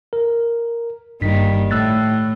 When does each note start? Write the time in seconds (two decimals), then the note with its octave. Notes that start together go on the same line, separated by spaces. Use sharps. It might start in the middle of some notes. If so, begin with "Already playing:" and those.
0.13 A#4
1.21 G1 G2 D#3 G3 A#3 B6
1.71 A2 E6 F#6 A6